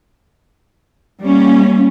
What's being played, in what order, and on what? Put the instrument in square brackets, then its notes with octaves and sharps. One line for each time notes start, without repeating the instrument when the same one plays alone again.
[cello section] G3 A#3 C#4